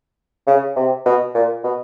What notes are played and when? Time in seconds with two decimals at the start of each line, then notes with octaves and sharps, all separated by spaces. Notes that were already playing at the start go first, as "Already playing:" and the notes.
0.47 C#3
0.76 C3
1.06 B2
1.35 A#2
1.64 B2